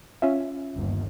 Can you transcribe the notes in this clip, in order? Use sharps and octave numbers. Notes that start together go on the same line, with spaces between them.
C#4 F4 E5
G1 D#2